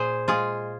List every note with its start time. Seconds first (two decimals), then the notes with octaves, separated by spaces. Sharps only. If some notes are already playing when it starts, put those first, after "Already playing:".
Already playing: A#2 G#4 C5
0.28 G#3 F4 G#4